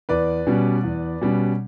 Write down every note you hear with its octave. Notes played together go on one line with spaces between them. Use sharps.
E2 B4 D5
B2 G3 C#4
E2
B2 G3 C#4